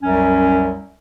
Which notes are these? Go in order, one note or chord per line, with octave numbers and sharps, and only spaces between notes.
C2 F#2 F#3 C#4